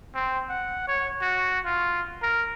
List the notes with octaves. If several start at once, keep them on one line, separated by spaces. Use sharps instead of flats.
C4
F#5
C#5
F#4
F4
A#4